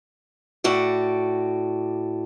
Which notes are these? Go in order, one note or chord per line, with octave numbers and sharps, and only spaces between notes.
A2 F#4 D5